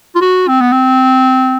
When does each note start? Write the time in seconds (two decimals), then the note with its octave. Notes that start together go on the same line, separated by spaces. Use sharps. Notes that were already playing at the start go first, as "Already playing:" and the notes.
0.15 F4
0.21 F#4
0.48 C4
0.61 B3
0.72 C4